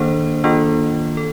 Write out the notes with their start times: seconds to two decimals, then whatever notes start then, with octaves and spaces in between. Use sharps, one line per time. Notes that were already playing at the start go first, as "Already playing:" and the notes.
Already playing: D#3 A#3 D4 A4 C5
0.44 D#3 A#3 D4 F4 A4
1.17 A4